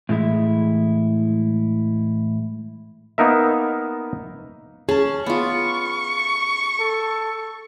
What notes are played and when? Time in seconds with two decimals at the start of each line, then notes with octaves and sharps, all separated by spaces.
0.09 A2 E3 G#3 E4
3.18 A#3 B3 D#4 A#4 E5
4.89 C#4 G#4 A5
5.26 B3 F4 C#6
6.80 A4